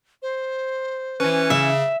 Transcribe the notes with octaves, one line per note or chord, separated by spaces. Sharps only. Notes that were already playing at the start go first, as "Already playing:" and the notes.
C5
E3 C#4 B4
C#3 E5